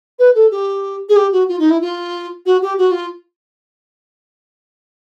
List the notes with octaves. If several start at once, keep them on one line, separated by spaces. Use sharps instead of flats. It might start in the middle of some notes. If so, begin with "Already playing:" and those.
B4
A4
G4
G#4
G4
F#4
F4
D#4
E4
F4
F#4
G4
F#4
F4